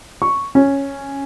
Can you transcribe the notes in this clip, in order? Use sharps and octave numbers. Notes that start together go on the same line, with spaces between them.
C#6
C#4